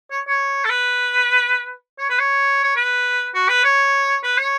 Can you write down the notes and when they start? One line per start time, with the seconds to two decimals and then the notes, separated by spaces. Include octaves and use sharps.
0.11 C#5
0.28 C#5
0.65 A4
0.70 B4
1.98 C#5
2.10 B4
2.20 C#5
2.64 C#5
2.76 B4
3.35 F#4
3.49 B4
3.65 C#5
4.23 B4
4.38 C#5